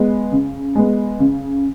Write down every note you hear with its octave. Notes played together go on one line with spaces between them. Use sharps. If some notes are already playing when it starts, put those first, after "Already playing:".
Already playing: G#3 B3
C#3
G#3 B3
C#3